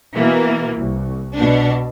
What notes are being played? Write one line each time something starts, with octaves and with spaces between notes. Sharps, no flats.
B2 E3 A#3
C2
B2 D4